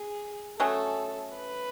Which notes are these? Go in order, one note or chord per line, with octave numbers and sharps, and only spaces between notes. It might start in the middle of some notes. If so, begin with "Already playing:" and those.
Already playing: G#4
F#3 A3 C#4 G#4 A4
B4